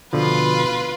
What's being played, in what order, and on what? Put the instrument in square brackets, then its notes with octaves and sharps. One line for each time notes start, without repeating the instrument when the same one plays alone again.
[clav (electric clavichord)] B2 D3 F3 [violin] F4 B4